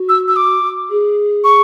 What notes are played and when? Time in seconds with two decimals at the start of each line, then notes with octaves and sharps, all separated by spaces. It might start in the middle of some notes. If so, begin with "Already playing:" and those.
Already playing: F#4
0.09 E6
0.28 E6
0.36 D6
0.90 G#4
1.44 C#6